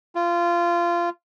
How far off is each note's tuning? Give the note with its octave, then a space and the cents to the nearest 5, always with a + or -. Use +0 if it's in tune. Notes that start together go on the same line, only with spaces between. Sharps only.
F4 -20